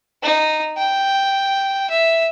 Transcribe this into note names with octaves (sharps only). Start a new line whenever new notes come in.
D#4
G5
E5